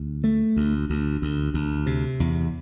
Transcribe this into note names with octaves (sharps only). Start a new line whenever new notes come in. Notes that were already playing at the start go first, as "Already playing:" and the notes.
Already playing: D2
A3
D2
D2
D2
D2
C3
E2